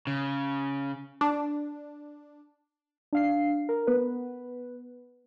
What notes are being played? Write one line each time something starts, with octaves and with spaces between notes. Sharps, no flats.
C#3
D4
D4 F5 C7
A#4
B3 B4